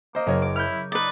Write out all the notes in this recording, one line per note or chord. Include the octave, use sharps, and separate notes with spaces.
A#3 C5 D#5
F#1 A#4 C#5 D#5
D6
E4 F6 G6
D#4 B4 D5